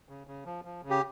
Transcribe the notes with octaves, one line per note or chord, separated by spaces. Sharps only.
C#3
C#3
F3
F3
C#3
G4